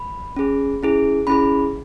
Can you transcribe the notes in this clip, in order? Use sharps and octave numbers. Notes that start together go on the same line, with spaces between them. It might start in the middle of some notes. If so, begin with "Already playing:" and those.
Already playing: B5
C#4 G#4
C#4 E4 G#4
C#4 E4 G#4 B5